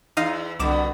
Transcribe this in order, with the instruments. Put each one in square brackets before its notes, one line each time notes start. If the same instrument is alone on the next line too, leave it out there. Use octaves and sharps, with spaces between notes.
[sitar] E2 [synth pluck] D#4 D#5 F5
[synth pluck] C2 D6 E7 [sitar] B2 D3